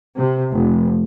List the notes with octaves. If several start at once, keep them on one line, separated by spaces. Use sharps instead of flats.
C3
F1